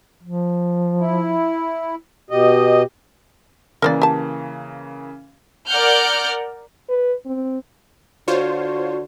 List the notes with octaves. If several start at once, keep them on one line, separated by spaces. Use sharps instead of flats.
F3
E4
B2 G4 D#5
C#3 E3 A#3 A#4 C5 D5
G4 A5
A#4 D5 F#5 F6 G6
B4
C4
D3 F4 F#4 C5 C#5